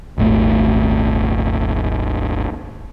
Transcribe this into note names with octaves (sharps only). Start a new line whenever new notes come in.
D#1 G#1 A3